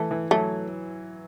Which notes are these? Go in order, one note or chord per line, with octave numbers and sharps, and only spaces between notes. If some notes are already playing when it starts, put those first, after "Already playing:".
Already playing: E3 A3
E3
F#3 A3